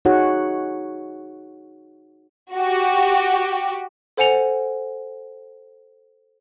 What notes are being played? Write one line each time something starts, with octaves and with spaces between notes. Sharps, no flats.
D#4 F#4 G#4 C#5 F#5
F#4 G4
A4 C5 F#5 G#5 C#7 F7